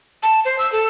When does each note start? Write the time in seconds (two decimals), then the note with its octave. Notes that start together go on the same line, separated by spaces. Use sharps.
0.23 A5
0.45 C5
0.59 E6
0.72 A4